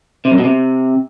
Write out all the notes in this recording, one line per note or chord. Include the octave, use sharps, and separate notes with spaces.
C3
F#2
B2
C3